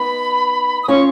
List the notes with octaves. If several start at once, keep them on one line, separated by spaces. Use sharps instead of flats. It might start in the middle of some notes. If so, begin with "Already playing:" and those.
Already playing: B3 D#4 B5
D#6
C#4 F4 C#6